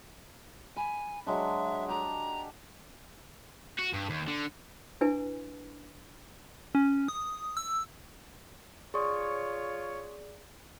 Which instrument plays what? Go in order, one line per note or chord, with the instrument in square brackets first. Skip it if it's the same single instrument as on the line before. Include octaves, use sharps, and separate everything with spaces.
[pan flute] G#5 [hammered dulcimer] B5
[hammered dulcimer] F#3 G#3 D4 [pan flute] E5
[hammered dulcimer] G4 A5 [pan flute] A#5
[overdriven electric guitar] F#4
G2
D#2
D3
[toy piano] D4 E4 B4 G#5
[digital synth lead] C#4
D#6
E6
[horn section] F4 C#5 [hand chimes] G#4 D5 [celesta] C6 C#6 D#6